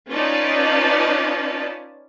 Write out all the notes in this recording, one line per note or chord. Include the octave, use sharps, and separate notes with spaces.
C#4 D#4 F4 B4 D5 A5